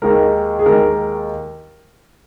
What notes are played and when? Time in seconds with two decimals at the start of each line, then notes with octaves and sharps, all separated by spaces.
0.02 D#2 D#3 G#3 A#4
0.59 G#4
0.66 D#2 D#3 G#3 A#4